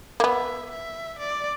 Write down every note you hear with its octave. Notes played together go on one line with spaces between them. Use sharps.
A#3
B3 E5
E5
D5